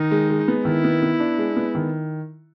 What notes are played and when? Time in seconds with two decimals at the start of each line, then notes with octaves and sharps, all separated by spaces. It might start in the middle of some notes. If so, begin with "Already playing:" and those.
Already playing: D#3 D#4
0.11 G#3
0.30 G#3
0.48 B3
0.65 D#3 E4
0.84 B3
1.02 B3
1.20 D4
1.38 G#3
1.57 B3
1.75 D#3